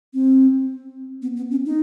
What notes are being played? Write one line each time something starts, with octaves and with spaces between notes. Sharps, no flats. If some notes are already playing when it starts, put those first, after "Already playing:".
C4
B3
B3
C#4
D#4